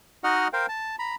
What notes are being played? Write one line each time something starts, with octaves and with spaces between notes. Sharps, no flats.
D#4 F#4 D#5 F#5 F6
A#4 C5 F5 G5
A5
A#5 B5